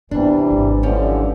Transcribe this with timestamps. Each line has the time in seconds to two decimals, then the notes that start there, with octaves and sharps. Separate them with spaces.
0.11 C3 E3 G3 B3 C4 D4
0.50 G#1
0.83 D3 E3 F3 G3 C#4